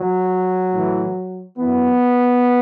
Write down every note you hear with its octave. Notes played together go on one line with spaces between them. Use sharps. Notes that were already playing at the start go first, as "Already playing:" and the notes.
Already playing: F#3
A2 E3
F#2 E3 B3